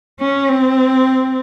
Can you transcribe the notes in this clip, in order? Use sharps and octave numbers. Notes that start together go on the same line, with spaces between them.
C#4
C4